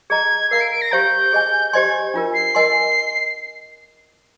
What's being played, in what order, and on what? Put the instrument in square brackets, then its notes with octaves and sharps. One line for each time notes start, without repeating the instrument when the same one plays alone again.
[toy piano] G#4 D#5 A#5 [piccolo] G#6
[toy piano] A#4 F5 A#5 [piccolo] C7
[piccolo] D7
D7
A#6
[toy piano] G4 C5 F5 A#5 [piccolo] G6
[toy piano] G#4 D#5 G#5
[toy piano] G4 C5 D#5 G#5 C6 [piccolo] G#6
[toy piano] D4 F4 A#4
[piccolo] C7
[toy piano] A#4 D#5 G#5 C6